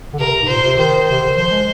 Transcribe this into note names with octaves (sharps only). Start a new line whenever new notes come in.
D3
C3 A#4
G#2
A#2 C5
C3
D#3 C5
C3 C5
D3
D#3
F3 C5
G#3